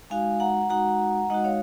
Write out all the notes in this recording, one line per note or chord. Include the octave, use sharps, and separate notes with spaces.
G#3 D#4 F#4 F5 G#5
F#5 A#5
G#3 D#4 F#4 F#5 A#5
G#3 D#4 F#4 D#5 F#5
C#5 F5